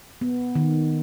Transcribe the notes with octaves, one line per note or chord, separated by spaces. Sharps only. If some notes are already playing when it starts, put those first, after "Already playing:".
B3
D#3